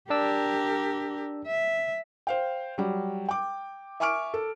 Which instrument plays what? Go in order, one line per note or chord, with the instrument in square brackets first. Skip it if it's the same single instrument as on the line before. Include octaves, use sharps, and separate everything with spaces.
[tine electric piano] D4 D5 E6 [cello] G4 A#4
[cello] E5
[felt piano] C5 F5 G5
F#3 G3
G5 D6
E5 G#5 C#6 D6 F6 D7
A4